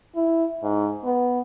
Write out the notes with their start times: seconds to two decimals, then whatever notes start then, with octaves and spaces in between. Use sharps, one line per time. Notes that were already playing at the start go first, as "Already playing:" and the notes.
0.15 E4
0.63 G#2
1.05 B3